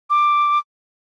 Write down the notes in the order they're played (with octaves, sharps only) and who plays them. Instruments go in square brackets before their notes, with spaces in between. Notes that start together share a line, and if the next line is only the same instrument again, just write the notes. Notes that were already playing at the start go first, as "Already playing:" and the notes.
[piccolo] D6